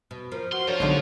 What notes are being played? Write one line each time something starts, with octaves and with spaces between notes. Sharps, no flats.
B2
F3 A#4
F#4 C6
F3 D4 F4 A#4 C#5
B1 D3 G#3 D4 D#4